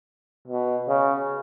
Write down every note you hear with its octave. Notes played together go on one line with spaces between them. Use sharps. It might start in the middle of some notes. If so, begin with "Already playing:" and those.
B2
C#3